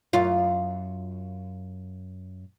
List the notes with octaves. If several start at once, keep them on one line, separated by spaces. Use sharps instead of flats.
F#2 F4